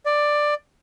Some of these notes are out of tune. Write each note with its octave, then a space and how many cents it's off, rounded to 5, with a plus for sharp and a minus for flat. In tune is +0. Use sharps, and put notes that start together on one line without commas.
D5 +10